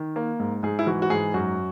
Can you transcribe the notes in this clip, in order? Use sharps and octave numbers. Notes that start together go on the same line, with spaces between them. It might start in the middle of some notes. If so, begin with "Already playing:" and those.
Already playing: D#3
A#3
G#2
G#2 G#4
E4
E3 F#4
F#4
G#2 G#4
F#2 F#4